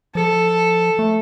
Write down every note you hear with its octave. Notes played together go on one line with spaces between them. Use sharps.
F3 A4
A3